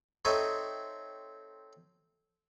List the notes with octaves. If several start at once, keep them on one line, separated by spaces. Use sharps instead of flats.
C4 D#4 A4 C#5 D#5 E5